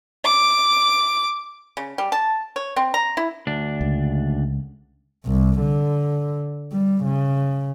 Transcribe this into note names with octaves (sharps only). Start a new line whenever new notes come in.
D6
C#3
G3
A5
C#5
C4
A#5
E4
D2 D4
C#2
C2
D3
G3
C#3